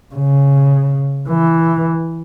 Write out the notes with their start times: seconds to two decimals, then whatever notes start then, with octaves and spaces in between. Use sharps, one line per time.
0.15 C#3
1.29 E3